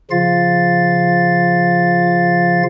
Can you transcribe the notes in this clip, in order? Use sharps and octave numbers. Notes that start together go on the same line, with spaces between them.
C#3 F3 F4 F5 A6